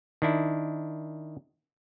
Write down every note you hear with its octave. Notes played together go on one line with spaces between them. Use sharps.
D#3 D4 E4